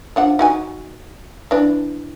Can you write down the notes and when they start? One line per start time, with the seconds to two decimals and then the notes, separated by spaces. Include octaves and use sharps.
0.16 F3 D4 F#5
0.39 D#4 F#4 G#5
1.51 E3 D4